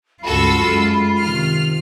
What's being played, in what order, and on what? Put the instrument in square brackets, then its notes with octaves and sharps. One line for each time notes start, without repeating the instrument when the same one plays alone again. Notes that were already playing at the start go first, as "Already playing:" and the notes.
[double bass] C#2 G2 [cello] F4 [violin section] F#4 A4 E6 [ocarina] B5
[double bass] F#2 G#3
[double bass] C3 D#3 [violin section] F6